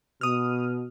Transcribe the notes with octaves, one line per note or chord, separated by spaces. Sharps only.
B2 D#6 F6